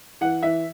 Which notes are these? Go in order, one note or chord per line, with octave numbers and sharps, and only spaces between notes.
E3 F#5
E3 E5